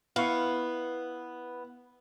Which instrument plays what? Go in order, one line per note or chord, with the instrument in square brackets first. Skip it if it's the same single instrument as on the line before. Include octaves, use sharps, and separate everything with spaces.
[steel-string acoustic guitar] B3 [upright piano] E4 [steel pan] F5 C#6